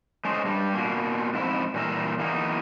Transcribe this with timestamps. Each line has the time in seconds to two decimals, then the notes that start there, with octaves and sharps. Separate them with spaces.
0.25 G#3 A3 C#4 C5 C#5 D#5
0.45 G2 G3
0.74 B2 A#3
1.33 F2 G#2 E4
1.74 G2 A#2 E3 A#4 E5
2.19 E2 E3 A#3 D#4